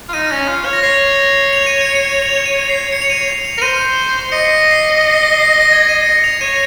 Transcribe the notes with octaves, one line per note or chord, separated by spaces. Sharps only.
F4
D#4 D#7
C#4
F4
C#5
A#6
C#5 C7
F7
D#7
C#7
D#7
F7
D#7
C7
C#7
F7
D#7
F7
A#4
C5 D#7
D#5 C#7
C7
A#6
C7
A#6
C7
A#6
C7
A#6
C7
A#6
C7
A#6
G#6
D#7
C#7
F7
C#5 D#7